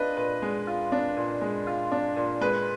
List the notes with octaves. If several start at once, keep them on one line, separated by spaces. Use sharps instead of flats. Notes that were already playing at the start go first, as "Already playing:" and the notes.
Already playing: D4 F4 B4 D#5
A#2 B4
G#3
F4
D4
A#2
G#3
F4
D4
A#2
G#3 B4